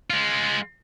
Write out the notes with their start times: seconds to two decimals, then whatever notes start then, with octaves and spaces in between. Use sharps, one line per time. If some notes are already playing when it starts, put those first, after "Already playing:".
0.10 G#3 F4